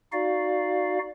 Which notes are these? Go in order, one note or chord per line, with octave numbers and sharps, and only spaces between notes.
D#4 F#4 D5 F5